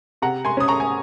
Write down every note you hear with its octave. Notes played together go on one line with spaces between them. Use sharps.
C3 F#5 A#5
G#5 C6
C#4 D#6
A#5 C#6
G#5